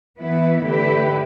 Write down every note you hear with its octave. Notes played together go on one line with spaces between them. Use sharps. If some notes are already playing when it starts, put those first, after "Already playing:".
E3 B3 E4 B4
D3 A3 E4 G4 B4